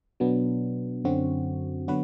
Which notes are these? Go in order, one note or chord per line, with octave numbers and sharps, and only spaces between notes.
B2 F#3 B3 D4
F#2 D3 F#3 C4 F#4
D3 F#3 B3 F#4 B4